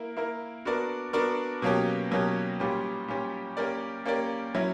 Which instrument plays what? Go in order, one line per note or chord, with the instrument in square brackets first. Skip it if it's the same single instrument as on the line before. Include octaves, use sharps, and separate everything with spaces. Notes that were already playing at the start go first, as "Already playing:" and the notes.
Already playing: [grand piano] A#3 E4 A#4
A#3 E4 A#4
B3 D4 F#4 A#4 D5
B3 D4 F#4 A#4 D5
B2 F#3 A#3 C#4 G4
B2 F#3 A#3 C#4 G4
A#2 G3 C#4 G4
A#2 G3 C#4 G4
A#3 C#4 G4 A#4 D5
A#3 C#4 G4 A#4 D5
F#3 C#4 E4